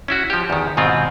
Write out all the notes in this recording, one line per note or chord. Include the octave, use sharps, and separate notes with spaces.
C#4 E4 F#4
F3 G4
E2 D#3
G#2 B2 D#3 C4 F4